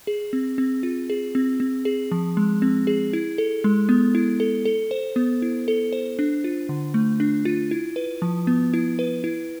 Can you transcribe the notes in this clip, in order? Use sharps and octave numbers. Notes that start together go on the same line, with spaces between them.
G#4
C4
C4
F4
G#4
C4
C4
G#4
F3
G#3
C4
G#4
E4
A4
G#3
B3
E4
A4
A4
C5
B3
E4
A4
C5
D4
F4
D3
A3
D4
F4
E4
B4
F3
B3
E4
B4
E4